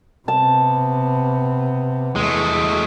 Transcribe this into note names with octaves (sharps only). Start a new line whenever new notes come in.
C3 B3 A5
E2 G#3 A3